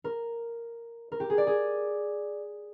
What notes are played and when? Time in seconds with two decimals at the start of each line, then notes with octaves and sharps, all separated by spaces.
0.04 A#4
1.12 A#4
1.20 G4
1.30 G#4
1.38 D5
1.47 G#4